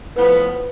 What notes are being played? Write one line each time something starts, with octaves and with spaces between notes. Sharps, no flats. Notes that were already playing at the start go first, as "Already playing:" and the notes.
A2 F3 B3 B4